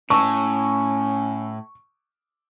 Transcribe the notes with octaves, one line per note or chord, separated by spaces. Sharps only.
A2 C#4 A5 C#6 E6